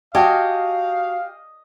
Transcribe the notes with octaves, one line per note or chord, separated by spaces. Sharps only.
F#4 G4 D#5 F5 F#5 G#5 A5